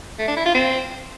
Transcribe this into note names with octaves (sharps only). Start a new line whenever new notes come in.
A3
D4
E4
F4
C4